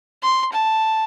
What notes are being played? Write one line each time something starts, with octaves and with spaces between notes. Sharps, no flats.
C6
A5